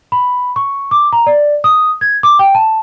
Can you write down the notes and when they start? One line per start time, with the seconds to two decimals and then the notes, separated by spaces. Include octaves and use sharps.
0.12 B5
0.56 C#6
0.91 D6
1.13 A#5
1.26 D5
1.64 D#6
2.01 G#6
2.23 D6
2.39 G5
2.55 A5